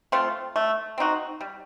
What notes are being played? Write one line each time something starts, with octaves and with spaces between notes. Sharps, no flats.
A3 C4 F4
A3
C4 D#4 F#4
G3